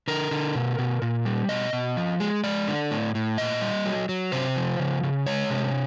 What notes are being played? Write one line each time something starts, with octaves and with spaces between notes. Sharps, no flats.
D3 A#4
D3
B2
B2
A#2
G3
B2 D#5
B2
F3
G#3
G#3 D5
D3
A2
A2
A#2 D#5
G3
F#3
F#3
C3 C5
F3
C#3
C#3
G#3 C#5
C3